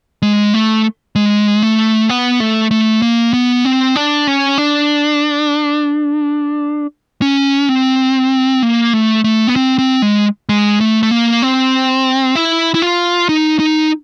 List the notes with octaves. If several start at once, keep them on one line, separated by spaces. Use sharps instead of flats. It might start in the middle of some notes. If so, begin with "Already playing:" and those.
G#3
A3
G#3
A3
B3
A3
A3
A#3
B3
C4
D4
C#4
D4
C#4
C4
A#3
A3
A3
B3
C4
C4
G#3
G#3
A3
A3
A#3
C4
E4
E4
F4
D#4
D#4